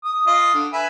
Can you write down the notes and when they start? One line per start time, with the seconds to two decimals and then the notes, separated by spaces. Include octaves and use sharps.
0.04 D#6
0.27 F4 D#5
0.54 D3
0.73 B4 E5 G#5